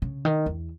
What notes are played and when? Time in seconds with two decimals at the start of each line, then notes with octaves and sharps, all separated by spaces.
0.02 C#3
0.25 D#3
0.46 E2